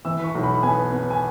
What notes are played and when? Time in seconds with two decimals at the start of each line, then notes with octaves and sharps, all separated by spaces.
0.05 E3 E6
0.24 C#6
0.35 B1
0.43 B5
0.63 B3 G#5
0.92 B3
1.11 G#5